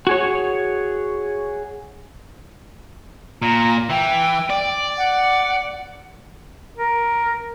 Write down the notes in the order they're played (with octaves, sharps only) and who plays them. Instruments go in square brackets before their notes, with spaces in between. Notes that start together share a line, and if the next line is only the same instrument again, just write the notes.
[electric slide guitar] F#4 G#4 C#5
[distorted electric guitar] A#2 [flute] A#5
[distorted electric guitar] E3 [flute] G5
[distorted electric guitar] D5
[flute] F#5
[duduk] A#4